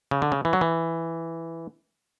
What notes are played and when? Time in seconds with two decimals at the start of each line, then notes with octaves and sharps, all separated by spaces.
0.11 C#3
0.22 D3
0.32 C#3
0.45 E3
0.53 F#3
0.61 E3